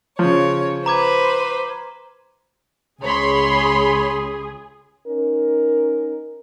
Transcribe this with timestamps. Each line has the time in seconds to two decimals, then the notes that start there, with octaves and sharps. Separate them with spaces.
0.19 C#3 F3 C#5
0.86 B4 C5 A#5 D6 G#6
3.02 C#2 G#4 C#5 B5 C6
5.07 C#4 D#4 A#4